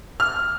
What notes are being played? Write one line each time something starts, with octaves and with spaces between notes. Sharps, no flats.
F6